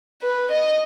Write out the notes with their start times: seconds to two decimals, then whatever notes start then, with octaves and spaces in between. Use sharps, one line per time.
0.22 B4
0.51 D#5